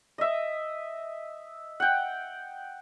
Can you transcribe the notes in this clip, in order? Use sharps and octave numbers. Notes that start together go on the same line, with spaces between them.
D#5 E5
F#5 G5